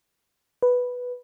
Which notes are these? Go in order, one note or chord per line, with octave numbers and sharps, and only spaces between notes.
B4